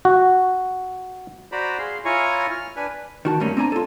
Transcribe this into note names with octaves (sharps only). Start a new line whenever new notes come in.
F#4
F#4 C5 D5 A#5 B5
G#4 F5 C6
E4 F4 C#5 G#5 A#5 C#6
F6
D4 B4 G#5
D#3 F#4 A5
G2 G3 A3 A#3 C#4
C4 D4 G#5 A#5
F4 A4